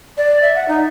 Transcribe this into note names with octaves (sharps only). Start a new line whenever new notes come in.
D5
E5
F#5
D#4